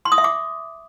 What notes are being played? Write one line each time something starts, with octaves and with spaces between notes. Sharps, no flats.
C6
D#6
E5
D6